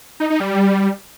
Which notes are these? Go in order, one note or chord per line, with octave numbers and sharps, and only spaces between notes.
D#4
D#4
G3